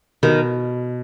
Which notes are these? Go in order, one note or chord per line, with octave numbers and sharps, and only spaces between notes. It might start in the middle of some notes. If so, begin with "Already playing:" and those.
B2 D#3